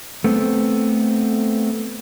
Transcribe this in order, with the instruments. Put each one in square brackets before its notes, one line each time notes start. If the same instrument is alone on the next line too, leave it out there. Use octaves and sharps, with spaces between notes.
[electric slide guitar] A3 B3 C4